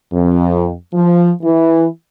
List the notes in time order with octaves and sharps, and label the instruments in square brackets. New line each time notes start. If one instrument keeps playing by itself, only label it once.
[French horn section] F2
F3
E3